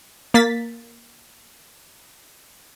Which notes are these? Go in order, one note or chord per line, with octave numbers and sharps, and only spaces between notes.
A#3 A6 B6